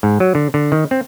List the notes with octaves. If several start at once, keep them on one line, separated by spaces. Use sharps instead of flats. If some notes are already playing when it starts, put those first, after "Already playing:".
G#2
F#3
D3
D3
D#3
C4